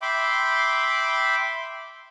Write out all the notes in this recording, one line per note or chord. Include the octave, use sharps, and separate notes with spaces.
E5 G5 B5 C6 D6